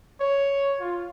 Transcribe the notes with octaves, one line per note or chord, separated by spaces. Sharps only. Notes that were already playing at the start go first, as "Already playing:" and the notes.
C#5
F4